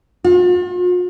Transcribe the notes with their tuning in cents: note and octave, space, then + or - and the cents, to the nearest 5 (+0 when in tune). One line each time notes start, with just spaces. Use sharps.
F4 +45